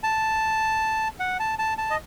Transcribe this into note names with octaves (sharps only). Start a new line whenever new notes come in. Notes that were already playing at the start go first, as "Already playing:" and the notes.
A5
F#5
A5
A5
A5
D#5